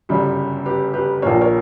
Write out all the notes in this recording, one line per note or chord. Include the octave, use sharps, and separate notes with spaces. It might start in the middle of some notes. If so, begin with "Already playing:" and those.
G1 F#2 C#3 G3 G4
G4 B4
G4 B4
A#1 A#2 A#3 A#4 C#5
A#4 C#5